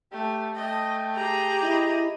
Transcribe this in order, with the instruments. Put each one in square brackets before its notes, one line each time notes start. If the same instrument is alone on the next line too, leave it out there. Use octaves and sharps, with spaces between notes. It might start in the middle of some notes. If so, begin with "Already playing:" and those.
[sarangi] A3 [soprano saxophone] G4
[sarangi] A3 [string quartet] D#5 [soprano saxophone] G5
[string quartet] G4 G#4 A#5
[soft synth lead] E4 [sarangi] D#5